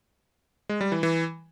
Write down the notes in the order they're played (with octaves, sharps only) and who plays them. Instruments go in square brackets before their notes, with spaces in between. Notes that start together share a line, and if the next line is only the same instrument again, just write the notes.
[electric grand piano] G#3
G3
E3
E3